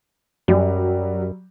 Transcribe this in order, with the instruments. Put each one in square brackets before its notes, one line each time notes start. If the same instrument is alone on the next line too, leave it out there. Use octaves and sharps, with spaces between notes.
[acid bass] F#2 [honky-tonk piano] F#3 G3